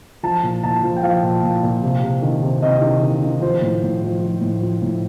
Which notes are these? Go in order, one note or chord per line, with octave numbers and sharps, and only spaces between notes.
F3 A5
A#2
A#2 A5
F3
G5
F3 F5
A#2
A#2
A#2
C3
C3
D#3
C3
C3 D#5
D#3
D#3
D#3
F3 C5
A2
A2
F3
F3
A2
F3
A2